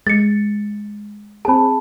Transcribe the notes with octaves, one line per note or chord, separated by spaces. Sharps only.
G#3 A6 C#7
C4 G#4 A5 B5